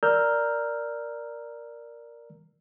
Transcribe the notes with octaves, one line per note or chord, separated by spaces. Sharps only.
A#4 D5 A#5 E6 F6 G6